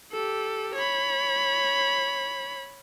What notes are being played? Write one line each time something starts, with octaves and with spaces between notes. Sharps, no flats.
G4 A4
C#5 B5